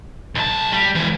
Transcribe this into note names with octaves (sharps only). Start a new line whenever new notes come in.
B1 A5
G3
E3 G#3